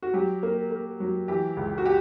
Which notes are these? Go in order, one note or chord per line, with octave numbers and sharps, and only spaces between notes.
F#4
F#3 G4
A#3
A#3
F#3
E3 G4
C#2
F#4
G4